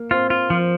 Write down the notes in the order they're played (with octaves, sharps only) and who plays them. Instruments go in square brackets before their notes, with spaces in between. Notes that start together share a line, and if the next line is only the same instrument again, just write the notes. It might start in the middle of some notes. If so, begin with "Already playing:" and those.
Already playing: [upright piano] A#3
[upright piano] C4 [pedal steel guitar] F4
[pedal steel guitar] F4
F3